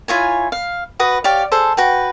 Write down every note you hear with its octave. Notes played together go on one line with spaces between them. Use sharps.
E4 F4 C#5 G#5
F5
F#4 B4 D#6
G4 C#5 D5 F5
G#4 A4 C5
F#4 B4 G5